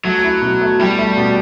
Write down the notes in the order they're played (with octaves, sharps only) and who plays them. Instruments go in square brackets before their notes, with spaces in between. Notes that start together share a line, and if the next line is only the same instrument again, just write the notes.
[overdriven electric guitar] F#3 [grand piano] A3
[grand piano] E4
B2
A3
[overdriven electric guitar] G3 [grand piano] E4
[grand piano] A3
B2